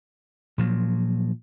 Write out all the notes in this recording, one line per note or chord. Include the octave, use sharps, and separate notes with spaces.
A#2 F3 F#3